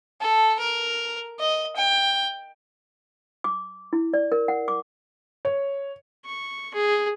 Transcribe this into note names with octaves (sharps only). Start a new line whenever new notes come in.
A4
A#4
D#5
G5
D6
E4
D5
A#4
F#5
D6
C#5
C#6
G#4